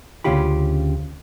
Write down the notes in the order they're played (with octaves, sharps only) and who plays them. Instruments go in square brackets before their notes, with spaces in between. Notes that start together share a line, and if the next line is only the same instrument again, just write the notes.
[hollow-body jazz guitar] D2 C#3 C#4 F4 G4 B5